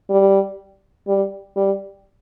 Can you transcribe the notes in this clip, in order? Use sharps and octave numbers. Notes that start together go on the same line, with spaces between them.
G3
G3
G3